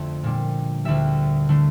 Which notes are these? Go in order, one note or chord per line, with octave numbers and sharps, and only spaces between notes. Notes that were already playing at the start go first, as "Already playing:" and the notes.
Already playing: F2 D3 A3 E5
A#2 G3 D4
D2 D3 G3 E5
D3 A3